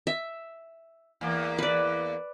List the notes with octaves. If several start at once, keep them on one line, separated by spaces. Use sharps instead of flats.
E5
E2 A#3
B4 D5